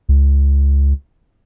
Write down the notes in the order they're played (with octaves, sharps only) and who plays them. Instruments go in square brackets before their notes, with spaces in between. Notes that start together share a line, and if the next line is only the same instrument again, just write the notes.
[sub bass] C#2